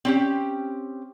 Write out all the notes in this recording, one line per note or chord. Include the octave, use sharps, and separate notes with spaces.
C4 C#4 G4